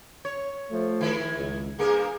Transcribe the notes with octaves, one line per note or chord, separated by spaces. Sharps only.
C#5
F3 A3
D#3 E4 G#4
C#2
G2 A#3 G#4 A#4